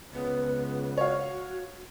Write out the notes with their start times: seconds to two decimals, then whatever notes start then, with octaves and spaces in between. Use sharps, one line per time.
0.12 C#2 B3
0.98 F#4 C#5 F5